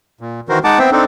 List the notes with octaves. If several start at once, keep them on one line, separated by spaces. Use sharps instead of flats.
A#2
D#3 E3 F#4 A#4 C5
G#3 D#4 F#5 A5 D6
B3 C4 C5 E5 G5
C4 D4 D#4 A4